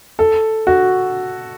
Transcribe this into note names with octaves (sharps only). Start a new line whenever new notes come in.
A4
F#4